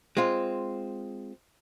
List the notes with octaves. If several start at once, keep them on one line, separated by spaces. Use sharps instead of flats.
G#3 C4 F4